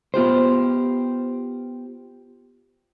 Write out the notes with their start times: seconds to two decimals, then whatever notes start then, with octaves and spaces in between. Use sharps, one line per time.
0.14 B3 F4 G4 C5